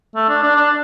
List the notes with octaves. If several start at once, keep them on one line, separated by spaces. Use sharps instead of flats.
A3
D4
D4
D4